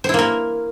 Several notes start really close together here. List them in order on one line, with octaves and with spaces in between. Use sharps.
C5 E4 A#3 A#4